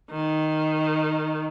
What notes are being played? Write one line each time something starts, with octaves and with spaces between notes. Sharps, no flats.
D#3